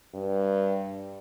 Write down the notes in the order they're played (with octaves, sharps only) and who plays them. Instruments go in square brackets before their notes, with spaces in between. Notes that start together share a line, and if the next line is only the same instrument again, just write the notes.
[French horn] G2